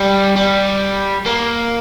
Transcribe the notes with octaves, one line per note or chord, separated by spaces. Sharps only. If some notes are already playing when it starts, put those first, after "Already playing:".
Already playing: G3
G3
A#3